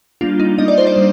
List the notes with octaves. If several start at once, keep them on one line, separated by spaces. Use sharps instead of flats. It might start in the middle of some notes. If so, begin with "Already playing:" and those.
G3 A#3 D4 F4
D#4
G3 A#3 D4 D#5
D5
C5
D5
G3